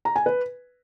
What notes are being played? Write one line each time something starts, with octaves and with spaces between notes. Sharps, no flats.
A#5
G#5
B4